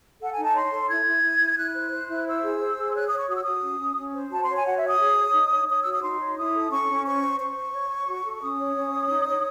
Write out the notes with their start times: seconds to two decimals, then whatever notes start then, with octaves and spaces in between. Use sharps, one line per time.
0.20 A4 F#5
0.32 G#5
0.37 D#4
0.43 A5
0.54 C#5 C6
0.71 A4
0.89 E4 G#6
1.06 E4
1.23 E4
1.40 E4
1.57 E4 F#6
1.75 C5
1.91 C5
2.09 E4
2.26 C5 E6
2.42 G#4
2.60 C5
2.77 G#4
2.94 C#5 F#6
3.06 D#6
3.11 C#5
3.17 C#6
3.28 F#4 D#6
3.35 E6
3.42 F#4 D#6
3.62 C#4
3.79 C#4
3.96 C#4
4.14 C5
4.31 F#4 A5
4.42 C6
4.48 C#5
4.53 G#5
4.65 F#4 F#5
4.76 E5
4.82 C#5
4.88 D#6
4.99 G#4
5.17 C#5
5.34 D#4
5.50 C#5
5.68 C#5 D#6
5.79 E6
5.85 F#4
5.91 D#6
6.02 D#4 C6
6.20 C#5
6.36 E4 D#6
6.53 A4
6.70 C#4 C#6
6.88 C#4
7.05 C5 C#6
7.21 C5
7.39 C5 C#6
7.56 C5
7.73 C#5
7.90 C#5
8.08 F#4
8.24 A4
8.41 C#4 D#6
8.59 C#5
8.75 C#4
8.93 C#5
9.10 D#4
9.27 C#5